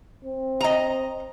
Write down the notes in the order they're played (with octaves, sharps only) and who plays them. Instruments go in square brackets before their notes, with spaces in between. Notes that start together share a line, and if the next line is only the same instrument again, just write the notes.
[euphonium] C4
[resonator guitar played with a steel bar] D#5 A#5